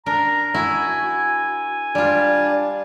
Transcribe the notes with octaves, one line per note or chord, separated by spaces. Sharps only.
D4 A#4 A#5
E4 F#4 G#5
G3 D4 F4